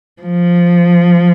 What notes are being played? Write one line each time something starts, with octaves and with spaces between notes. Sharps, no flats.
F3